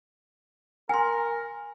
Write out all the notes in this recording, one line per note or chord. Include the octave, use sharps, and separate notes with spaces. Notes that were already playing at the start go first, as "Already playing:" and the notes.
A#4 G#5 C6